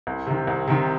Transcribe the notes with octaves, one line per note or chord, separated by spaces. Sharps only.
C2
C3 D#3
C2
C3 D#3